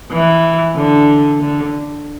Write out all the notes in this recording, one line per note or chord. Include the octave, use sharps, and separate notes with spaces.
E3
D3
D3